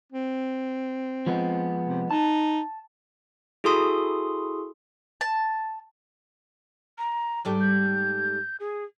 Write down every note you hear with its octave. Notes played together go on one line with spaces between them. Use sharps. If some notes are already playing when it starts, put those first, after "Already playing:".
C4
F3 G#3 B3
C3
D#4 A5
E4 F#4 G#4 A4 C6 D#6
A5
A#5
G#2 G3 A3
G6
G#4